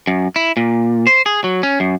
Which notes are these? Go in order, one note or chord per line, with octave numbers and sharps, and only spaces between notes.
F#2
E4
A#2
C5
G#4
F#3
C#4
F#2